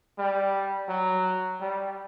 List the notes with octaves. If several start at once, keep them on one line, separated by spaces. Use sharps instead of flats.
G3
F#3
G3